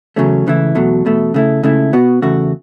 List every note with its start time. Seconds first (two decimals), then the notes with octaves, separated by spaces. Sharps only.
0.16 E2 C#3 F#3 A3 C#4
0.46 C#2 C#3 E3 A3 E4
0.75 E2 B2 F#3 A3
1.05 E2 B2 A3
1.34 C#3 A3 E4
1.63 C#2 C#3 A3 E4
1.93 B2 B3 F#4
2.22 E2 C#3 A3 F#4